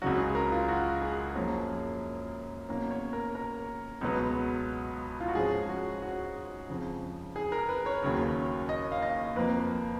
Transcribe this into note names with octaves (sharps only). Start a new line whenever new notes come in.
C#2 C#3 F#3 F#4
G#4
A#4
F4
F#4
G#4
F#2 F3 A#3 C#4
B2 A#3 C#4
C#5
A#4
A#4
C#2 B2 F#3 B3
F4
F#4
G#2 F3 G#3 C#4 G#4
F#4
F#4
F2 C#3 F3
G#4
A#4
B4
C#5
D#2 C#3 F#3
D#5
F5
D#5
F2 F3 A#3 B4